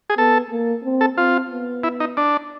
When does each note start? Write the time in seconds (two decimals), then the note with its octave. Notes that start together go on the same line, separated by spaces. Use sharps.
0.10 G#4
0.17 B3 A4
0.51 A#3
0.84 C4
1.01 A4
1.17 C4 F4
1.50 B3
1.84 E4
2.00 D#4
2.17 D4